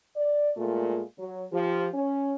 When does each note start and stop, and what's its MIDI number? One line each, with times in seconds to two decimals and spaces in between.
0.16 0.50 74
0.56 1.02 46
0.56 1.02 56
0.56 1.02 57
0.56 1.02 65
1.18 1.44 54
1.52 1.87 53
1.52 1.87 67
1.93 2.36 61